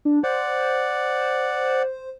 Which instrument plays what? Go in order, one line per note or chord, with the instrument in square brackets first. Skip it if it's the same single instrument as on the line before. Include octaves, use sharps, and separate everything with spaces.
[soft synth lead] D4
[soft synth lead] C5 [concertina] D5 F#5